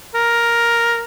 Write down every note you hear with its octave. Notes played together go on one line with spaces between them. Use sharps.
A#4